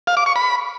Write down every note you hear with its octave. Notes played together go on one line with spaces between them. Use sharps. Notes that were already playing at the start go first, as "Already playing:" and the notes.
F5
D6
C#6
B5